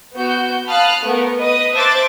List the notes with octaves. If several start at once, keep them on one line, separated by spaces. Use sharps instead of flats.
B3 F#4 G6
F5 A5 B5 D#6 F6 F#6
A3 B3 A#4
B4 D#5 D#6
C5 E5 A5 D6 F#6 A6